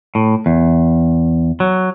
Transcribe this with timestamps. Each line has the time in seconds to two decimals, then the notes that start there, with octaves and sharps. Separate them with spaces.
0.15 A2
0.46 E2
1.60 F#3